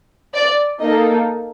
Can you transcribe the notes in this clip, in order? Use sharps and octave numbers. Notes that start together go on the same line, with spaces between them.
D5
A#3 D#4 A4 D#5